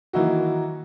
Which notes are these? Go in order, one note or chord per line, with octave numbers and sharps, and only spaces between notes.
D#3 E3 A#3 D#4 E4 F#4